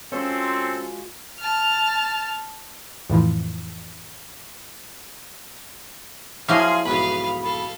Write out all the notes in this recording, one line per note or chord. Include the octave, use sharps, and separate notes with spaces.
G#3 C4 C#4 F4 F#4 A4 C5
A5 F6
F2 A2 E3 F3
F3 F#3 A#3 E4 G#4 F5 C6 C7
B1 E2 G#2 B4 F5 B5
A4 F5